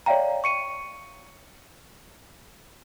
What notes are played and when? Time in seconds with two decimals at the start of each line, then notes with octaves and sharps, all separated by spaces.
0.06 C#5 D5 E5 F5 G5 A#5
0.44 C#6 C#7 D#7